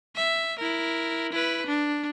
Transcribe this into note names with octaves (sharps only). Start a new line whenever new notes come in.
E5
E4 A#4
E4 B4
D4